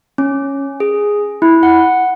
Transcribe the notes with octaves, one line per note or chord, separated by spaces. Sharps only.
C#4
G#4
E4
F#5